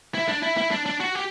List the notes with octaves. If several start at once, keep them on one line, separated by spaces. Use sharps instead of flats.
E4
D4
E4
E4
D4
D4
F#4
G4